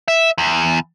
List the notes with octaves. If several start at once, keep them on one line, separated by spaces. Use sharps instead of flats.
E5
E2